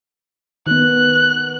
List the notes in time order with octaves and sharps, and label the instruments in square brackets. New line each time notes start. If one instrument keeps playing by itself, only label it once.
[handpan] D#3 B3 [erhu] F#6